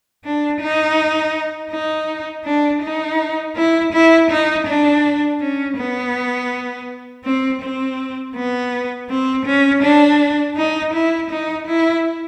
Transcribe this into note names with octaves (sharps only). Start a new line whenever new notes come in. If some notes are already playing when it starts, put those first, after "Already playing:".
D4
D#4
D#4
D4
D#4
E4
E4
D#4
D4
C#4
B3
C4
C4
B3
C4
C#4
D4
D#4
E4
D#4
E4